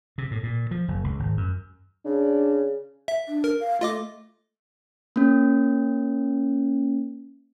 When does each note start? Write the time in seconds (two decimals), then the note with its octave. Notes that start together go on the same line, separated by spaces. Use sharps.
0.18 C3
0.31 A2
0.43 A#2
0.71 F3
0.88 F#1
1.04 C#2
1.19 G#1
1.37 F#2
2.06 C#3 D4
3.08 E5
3.28 D4
3.44 A#4
3.60 F5
3.81 A3 F4 D#5 D6
5.16 A#3 C#4